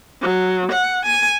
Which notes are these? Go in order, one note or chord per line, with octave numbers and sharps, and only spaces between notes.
F#3
F#5
G#5